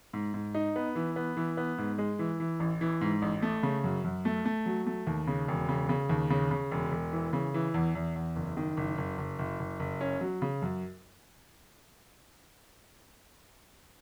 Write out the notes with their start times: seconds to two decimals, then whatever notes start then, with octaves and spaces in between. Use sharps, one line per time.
0.13 G#2
0.34 G#2
0.55 D#4
0.76 B3
0.95 E3
1.16 B3
1.37 E3
1.57 B3
1.78 G#2
1.98 G#3
2.19 E3
2.40 E3
2.60 A1
2.81 E3
3.01 G#2
3.22 A1
3.42 A3
3.63 C#3
3.84 F#2
4.04 F#2
4.25 A3
4.45 A3
4.66 F#3
4.86 A3
5.07 D#2
5.27 C#3
5.48 E1
5.69 C#3
5.89 C#3
6.09 D#2
6.30 C#3
6.51 C#3
6.71 E1
6.92 E1
7.13 E3
7.33 C#3
7.54 E3
7.74 E2
7.95 E2
8.16 E2
8.36 F#1
8.57 D#3
8.77 F#1
8.98 F#1
9.18 F#1
9.39 F#1
9.59 F#1
9.80 F#1
10.01 C#4
10.21 F#3
10.42 C#3
10.62 F#2